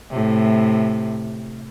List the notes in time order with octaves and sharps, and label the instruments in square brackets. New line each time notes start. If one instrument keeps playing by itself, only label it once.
[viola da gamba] A2 C3